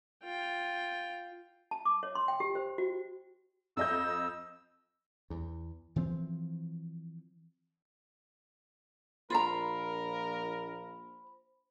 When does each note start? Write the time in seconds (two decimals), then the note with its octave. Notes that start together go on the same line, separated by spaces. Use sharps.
0.23 F4 G5
1.71 A5
1.85 D6
2.03 C#5
2.15 C6
2.28 G5
2.40 G4
2.55 C5
2.78 F#4
3.77 F2 D#5 E6 G6
5.30 E2
5.96 E3 F3 C4
9.30 A#1 F4 A#4 C5 A#5 B5